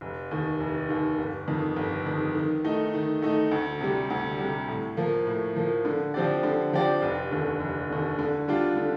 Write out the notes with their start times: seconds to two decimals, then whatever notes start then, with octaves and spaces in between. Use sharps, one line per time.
0.01 F1
0.31 D#2 D#3
0.60 F1
0.89 D#2 D#3
1.18 G1
1.48 F2 D#3
1.76 G1
2.06 F2 D#3
2.35 D#3
2.64 A3 D#4
2.94 D#3
3.22 A3 D#4
3.51 D2
3.81 C3 G3
4.10 D2
4.39 C3 G3
4.68 A2
4.97 F3 A#3
5.27 A2
5.56 F3 A#3
5.85 D3
6.14 F3 C4 G4 D5
6.43 D3
6.73 F3 C4 G4 D5
7.02 F1
7.31 D#2 D3
7.60 F1
7.90 D#2 D3
8.19 D3
8.48 G3 D4 F4
8.77 D3